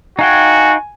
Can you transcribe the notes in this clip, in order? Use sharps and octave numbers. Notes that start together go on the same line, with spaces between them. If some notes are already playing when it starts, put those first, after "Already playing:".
D#4 F#4 F5 G5 G#5